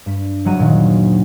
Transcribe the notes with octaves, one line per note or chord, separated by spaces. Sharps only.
G2 B6
F#1 F#3 G3 F#5 A#5 D#7
D2 A#2 D#3